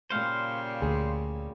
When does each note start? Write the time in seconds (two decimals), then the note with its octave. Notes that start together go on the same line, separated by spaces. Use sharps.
0.10 A#2 C#3 G3 C5 F5
0.82 D2 G#4